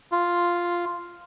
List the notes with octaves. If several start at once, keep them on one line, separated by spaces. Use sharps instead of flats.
F4